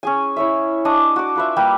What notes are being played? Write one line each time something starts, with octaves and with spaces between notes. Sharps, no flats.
C#4 G#4 G#5
E4 C#5 E5
D4 D#5 C#6
F#4 D6
F4 B4 E5
G3 A#3 G4 B4